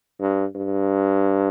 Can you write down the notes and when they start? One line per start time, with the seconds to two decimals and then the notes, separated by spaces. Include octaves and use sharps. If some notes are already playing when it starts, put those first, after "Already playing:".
0.20 G2
0.56 G2